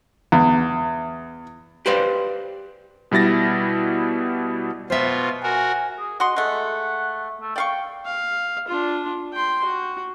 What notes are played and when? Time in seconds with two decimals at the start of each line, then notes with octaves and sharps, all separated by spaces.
0.32 E2
1.86 G4 B4 C5 D5 F5
3.11 B2 G3 E4 A6 A#6
4.90 B2 F4 C5 E5
5.43 F#4 A#4 G#5
5.99 G#4
6.20 F#4 D#5 F#5 C6
6.36 G#3 A3 F#5
7.41 A3
7.56 D5 F5 G5 C#6
8.05 F5
8.68 D4 F4
9.33 G5 C6
9.64 F#4